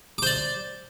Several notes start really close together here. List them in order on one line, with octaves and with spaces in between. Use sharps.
D6 C5 D5